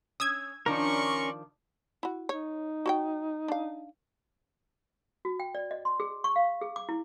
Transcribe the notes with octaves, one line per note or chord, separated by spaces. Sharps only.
C#4 D#6 E6 G#6
D#3 F3 C#4 D4 A#4 D5 C6 C#6
E4 F#4
D#4 C#5
F#4 C#5 G5
D4 F5
F#4
G5
D5
D#5
C6
G#4
C#6
F5
G#4
D6
E4